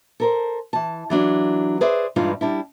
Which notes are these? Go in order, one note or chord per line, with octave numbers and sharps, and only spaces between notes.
A4 A#4 C5
E3 A5
E3 F#3 D4
G#4 B4 C5 D5 E5
G2 E3 G#3 D4 D#4 F4
G3 D4 E4